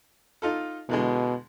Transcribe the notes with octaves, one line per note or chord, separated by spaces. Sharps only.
D#4 F4 A4
E2 B2 D3 G#3